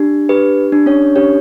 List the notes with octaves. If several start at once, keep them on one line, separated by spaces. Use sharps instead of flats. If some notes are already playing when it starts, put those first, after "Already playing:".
Already playing: D4 G4
G4 B4
D4
C#4 C#5
C#4 G4 C#5